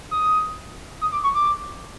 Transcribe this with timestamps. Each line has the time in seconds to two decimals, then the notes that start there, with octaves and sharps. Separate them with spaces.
0.11 D#6
1.01 D#6
1.12 D6
1.23 C#6
1.35 D6